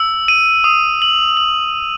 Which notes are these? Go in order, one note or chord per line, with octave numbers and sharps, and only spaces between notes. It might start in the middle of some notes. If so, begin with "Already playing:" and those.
Already playing: E6
D#7
D#6
F#7
F#7